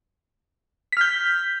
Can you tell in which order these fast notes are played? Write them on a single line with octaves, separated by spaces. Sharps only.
B6 F6 G6